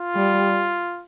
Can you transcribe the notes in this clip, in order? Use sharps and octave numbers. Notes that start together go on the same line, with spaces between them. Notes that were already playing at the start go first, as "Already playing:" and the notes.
Already playing: F4
G3